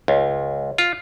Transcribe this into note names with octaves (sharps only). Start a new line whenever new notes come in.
C#2
F4